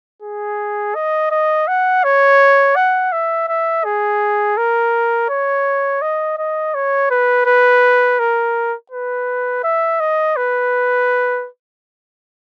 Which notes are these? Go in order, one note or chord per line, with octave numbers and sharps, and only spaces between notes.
G#4
D#5
D#5
F#5
C#5
F#5
E5
E5
G#4
A#4
C#5
D#5
D#5
C#5
B4
B4
A#4
B4
E5
D#5
B4